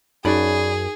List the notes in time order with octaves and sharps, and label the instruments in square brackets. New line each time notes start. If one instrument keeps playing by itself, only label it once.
[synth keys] F#2 [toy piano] D#4 [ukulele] F#4 D5 B5 [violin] G#4